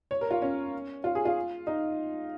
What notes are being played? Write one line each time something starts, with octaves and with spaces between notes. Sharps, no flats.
C#5
A#4
F4
C#4
F4
G#4
F4
D#4